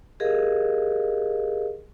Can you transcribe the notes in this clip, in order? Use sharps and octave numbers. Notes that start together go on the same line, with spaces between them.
G4 G#4 A#4 D#5 F5